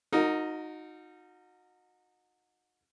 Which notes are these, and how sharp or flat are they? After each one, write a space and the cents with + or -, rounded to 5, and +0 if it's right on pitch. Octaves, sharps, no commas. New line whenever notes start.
D#4 +0 F#4 -30 A#4 -30